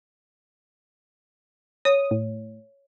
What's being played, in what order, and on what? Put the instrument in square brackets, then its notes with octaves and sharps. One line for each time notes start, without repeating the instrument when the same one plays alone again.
[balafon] C#5 [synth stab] D#6
[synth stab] A2